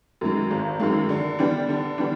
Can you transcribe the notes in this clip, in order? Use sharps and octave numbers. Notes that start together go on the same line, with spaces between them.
F#2 D#3 G#3
G#1
F#2 D#3 G#3
D3
G3 B3 D4
D3
G3 B3 D4